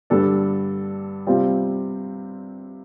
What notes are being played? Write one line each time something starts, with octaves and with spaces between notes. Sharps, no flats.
G2 D3 G3 D4 A4
C3 G3 C4 F4